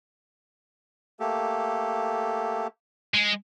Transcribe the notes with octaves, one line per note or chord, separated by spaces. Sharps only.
A3 A#3 G4 A4
G#3